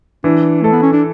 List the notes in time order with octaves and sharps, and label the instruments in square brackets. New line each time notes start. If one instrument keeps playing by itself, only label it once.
[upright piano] E3 [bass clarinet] D4
[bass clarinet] A3 [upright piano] A4
[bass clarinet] B3
C#4
D4